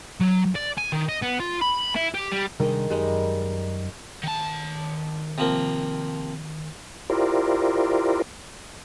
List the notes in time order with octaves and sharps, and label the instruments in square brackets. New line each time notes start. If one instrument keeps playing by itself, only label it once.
[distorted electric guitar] F#3
D5
G#5
D#3
D#5
B3
F4
B5
E4
G4
G3
[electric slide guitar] C3 G3 D4 [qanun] D#3 G#3 D#4
[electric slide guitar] F#2 [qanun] G3 G#3 D#4
[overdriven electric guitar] D#3 A5
[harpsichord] C3 F3 A#3
[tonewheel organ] E4 F4 G4 A#4 C5 D5